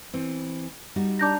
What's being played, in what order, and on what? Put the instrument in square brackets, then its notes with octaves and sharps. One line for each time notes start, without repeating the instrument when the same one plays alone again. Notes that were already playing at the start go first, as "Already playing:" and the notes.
[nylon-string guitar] E3 C4
G3 D#4 F#4
[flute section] D4 A#5 [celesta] D6 G6 A#6